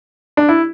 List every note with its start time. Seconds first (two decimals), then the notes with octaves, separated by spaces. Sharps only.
0.37 D4
0.49 E4